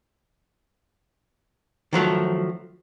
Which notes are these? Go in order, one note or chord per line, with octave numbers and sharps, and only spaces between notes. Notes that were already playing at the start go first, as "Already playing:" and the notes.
D#3 F3 F#3 A3